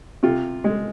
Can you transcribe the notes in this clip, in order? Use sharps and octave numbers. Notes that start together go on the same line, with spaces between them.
C3 F4
G#3